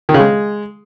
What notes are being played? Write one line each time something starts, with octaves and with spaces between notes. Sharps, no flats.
D#3
C#3
G#3